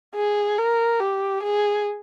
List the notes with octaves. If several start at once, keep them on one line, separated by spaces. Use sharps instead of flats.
G#4
A#4
G4
G#4